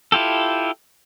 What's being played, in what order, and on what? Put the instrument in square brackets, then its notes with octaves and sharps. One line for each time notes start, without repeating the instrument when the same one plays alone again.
[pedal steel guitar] E4 F4 G4 A4